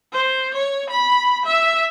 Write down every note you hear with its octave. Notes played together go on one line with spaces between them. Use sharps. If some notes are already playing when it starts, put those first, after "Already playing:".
C5
C#5
B5
E5